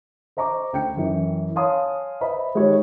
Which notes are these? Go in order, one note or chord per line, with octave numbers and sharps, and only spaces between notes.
C5 D#5 A#5 C#6 D6
D2 G5 C#7
F#2 E3
C#5 F5 G#5 A5 C6 D#6
B4 C5 D#5 E5 B5
D#3 G#3 G4 A4 C#5